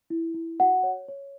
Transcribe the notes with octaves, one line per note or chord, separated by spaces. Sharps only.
E4
E4
F#4 F#5
C#5
C#5